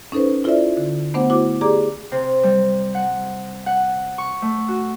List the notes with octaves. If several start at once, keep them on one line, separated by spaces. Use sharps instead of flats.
C#4 D#4 A4 B4 C5
E4 F4 A4 C5 D5 E5
D3
A3 B3 D4 C5 F#5
E4 F#4 C5 D6
G4 G#4 D5 A#5 D6
C3
G3
F#5
F#5
C#6
A3
F#4